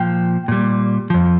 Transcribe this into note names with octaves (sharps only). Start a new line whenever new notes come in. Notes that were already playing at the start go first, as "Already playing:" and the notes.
Already playing: A#2 F3 G5
A#2 G3
F2 F3